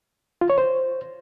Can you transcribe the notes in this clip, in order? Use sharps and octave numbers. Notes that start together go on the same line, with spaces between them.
F4
C#5
C5